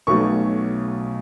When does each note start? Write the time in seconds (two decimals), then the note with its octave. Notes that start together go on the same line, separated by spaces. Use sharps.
0.07 B1 B2 F#3 A3 C#6